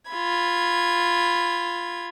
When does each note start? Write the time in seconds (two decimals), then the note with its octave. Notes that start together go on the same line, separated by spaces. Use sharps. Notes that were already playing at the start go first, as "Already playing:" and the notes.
0.10 F4 B5 G#6